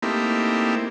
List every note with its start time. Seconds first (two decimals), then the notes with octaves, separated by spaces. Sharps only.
0.02 A3 A#3 C4 D#4 E4 G4